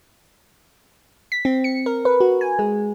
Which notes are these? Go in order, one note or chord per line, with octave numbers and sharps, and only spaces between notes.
B6
C4
C#7
A#4
B4
F#4
G#5
G#3